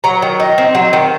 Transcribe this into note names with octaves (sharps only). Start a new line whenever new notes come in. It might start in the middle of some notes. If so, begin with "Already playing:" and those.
F#3 A#5
D#3
D#4
C4
F#3
D#3